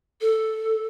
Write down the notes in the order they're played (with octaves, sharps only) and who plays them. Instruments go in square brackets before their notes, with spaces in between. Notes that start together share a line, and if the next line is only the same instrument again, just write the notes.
[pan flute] A4